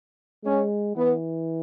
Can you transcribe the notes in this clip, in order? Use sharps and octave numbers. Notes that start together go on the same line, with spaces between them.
G#3 C#4
E3 B3